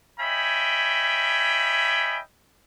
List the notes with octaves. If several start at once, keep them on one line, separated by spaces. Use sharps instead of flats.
C#5 D#5 E5 G5 G#5 B5